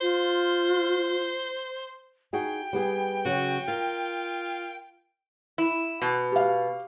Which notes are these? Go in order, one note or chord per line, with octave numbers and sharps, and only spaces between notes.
F4 C5
D#4 F#4 G#4 G5
G3 B3 G#4
C#3 F#3 F#4
F4 A#4
E4
B2
G4 F5